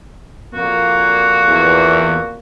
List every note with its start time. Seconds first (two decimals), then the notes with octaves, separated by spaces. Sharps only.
0.55 F2 A#2 A#3 F#4
1.48 E2